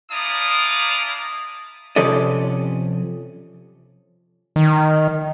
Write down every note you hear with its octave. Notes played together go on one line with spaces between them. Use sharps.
D4 E4 D5 F5 A#5 D#6
C3 F3 C#4 A4 D5 D#5
D#3